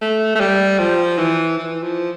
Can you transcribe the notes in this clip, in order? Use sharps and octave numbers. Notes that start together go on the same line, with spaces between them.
A3
A3
G3
F3
E3
E3
F3